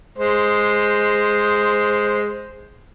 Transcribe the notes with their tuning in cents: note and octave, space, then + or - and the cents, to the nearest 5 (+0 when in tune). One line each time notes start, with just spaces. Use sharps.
G#3 +0 C5 +0